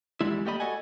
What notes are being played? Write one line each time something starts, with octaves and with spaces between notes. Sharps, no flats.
E2 G3 G#3 E4
A3 A#3 G4 D5 D#5 B5
F#4 A4 D5 D#5 F#5 G#5